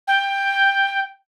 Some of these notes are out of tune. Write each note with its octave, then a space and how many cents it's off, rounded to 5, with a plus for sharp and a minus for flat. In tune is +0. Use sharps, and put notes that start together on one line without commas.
G5 +10